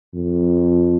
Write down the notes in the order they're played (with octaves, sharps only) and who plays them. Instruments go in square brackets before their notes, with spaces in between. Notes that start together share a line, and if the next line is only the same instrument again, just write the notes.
[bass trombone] F2